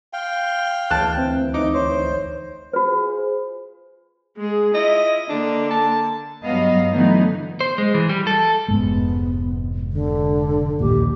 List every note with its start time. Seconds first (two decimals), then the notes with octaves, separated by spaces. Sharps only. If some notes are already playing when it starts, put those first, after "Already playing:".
0.13 F5 G5 C6
0.91 D2 E3 A5 F#6
1.18 C4
1.54 D#4 D6
1.74 C5 C#5
2.73 F4 F#4 G#4 B4 C5
4.37 G#3 G#4
4.74 E4 F4 D#5
5.29 D3 A#3 D4
5.70 A5
6.44 G2 F#3 B3 D#5 F5
6.91 D3 E3 F#3 A3 B3 D#4
7.60 C5
7.78 G#3
7.94 E3
8.09 G3
8.27 A4
8.68 F1 G#2 G#3 B3
9.93 D3
10.80 A#1 D#2 A#2 G4